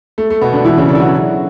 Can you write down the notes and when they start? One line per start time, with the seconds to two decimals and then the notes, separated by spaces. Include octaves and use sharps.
0.18 A3
0.30 A3
0.41 B2 B3
0.53 D3 D4
0.65 E3 E4
0.77 C#3 C#4
0.88 D3 D4
0.95 E4
1.00 F#3 F#4